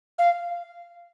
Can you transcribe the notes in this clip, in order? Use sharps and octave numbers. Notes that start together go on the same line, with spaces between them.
F5